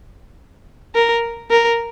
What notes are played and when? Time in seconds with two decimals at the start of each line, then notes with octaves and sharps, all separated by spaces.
0.95 A#4
1.51 A#4